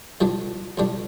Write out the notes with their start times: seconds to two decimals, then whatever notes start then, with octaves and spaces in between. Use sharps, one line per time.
0.21 F2 E3 G3 D4
0.78 F2 E3 G3 D4